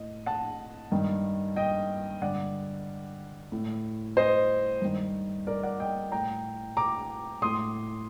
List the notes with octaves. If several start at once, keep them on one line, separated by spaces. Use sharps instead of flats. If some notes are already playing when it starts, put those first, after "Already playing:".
Already playing: A2 D#5
F#5 A5
G2 D#3
D#5 G5
G2 D3 D5 F#5
A2
C5 D#5
G2 D#3
A#4 D5
D5 F#5
D#5 G5
A2 G5 A#5
A#5 D6
A2 C6 D#6